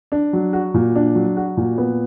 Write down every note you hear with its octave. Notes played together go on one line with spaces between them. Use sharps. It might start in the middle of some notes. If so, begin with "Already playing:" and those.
D4
F#3
F#4
A#2
D4
F#3
F#4
A#2
B3